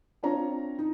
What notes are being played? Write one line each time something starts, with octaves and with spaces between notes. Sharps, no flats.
C4 D4 F4 C#5 A#5
D#4